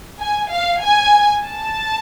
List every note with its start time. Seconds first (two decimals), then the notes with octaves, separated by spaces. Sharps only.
0.21 G#5
0.52 F5
0.83 G#5
1.46 A5